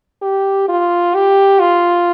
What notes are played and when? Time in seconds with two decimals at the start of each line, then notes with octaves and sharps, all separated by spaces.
0.22 G4
0.69 F4
1.15 G4
1.60 F4